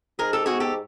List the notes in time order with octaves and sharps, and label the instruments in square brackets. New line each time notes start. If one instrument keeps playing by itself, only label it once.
[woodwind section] G#2 [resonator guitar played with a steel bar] G#4 A#4
[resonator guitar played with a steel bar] G4 A4
[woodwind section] B3 [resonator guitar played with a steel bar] F#4 G#4
[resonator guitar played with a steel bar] G4 A4